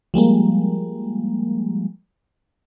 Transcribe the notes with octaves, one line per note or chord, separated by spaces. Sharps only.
F3 G3 G#3 A#3